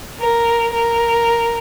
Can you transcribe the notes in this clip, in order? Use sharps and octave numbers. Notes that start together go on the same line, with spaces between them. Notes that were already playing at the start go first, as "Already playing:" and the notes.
A#4
A#4